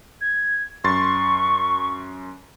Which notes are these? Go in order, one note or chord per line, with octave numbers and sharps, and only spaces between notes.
G#6
F#2 C6 C#6 A6